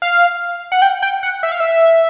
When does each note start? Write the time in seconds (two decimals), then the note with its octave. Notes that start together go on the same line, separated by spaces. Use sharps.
0.02 F5
0.72 F#5
0.82 G5
1.02 G5
1.23 F#5
1.43 E5
1.52 F5
1.60 E5